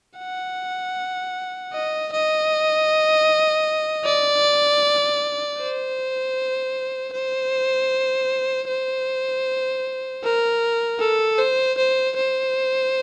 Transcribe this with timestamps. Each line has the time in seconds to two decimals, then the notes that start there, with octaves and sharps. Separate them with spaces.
0.18 F#5
1.73 D#5
2.12 D#5
4.05 D5
5.59 C5
7.13 C5
8.68 C5
10.23 A#4
11.00 A4
11.38 C5
11.77 C5
12.16 C5